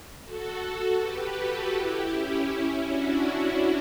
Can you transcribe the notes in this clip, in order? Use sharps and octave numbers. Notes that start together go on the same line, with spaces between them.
F#4 A4
G4 B4
F#4 A4
E4 G4
C#4 E4
D4 F#4